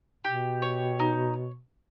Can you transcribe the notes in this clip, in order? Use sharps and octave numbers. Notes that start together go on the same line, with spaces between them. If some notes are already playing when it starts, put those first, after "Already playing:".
B2 G4
C#5
D#4